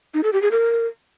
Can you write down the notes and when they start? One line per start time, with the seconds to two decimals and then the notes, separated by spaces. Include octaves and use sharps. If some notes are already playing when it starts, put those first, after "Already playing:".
0.14 D#4
0.23 A4
0.33 G4
0.42 G#4
0.51 A#4